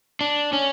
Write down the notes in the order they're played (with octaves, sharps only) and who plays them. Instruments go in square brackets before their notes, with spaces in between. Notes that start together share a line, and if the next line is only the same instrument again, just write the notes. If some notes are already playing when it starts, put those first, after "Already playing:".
[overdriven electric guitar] D4
C#4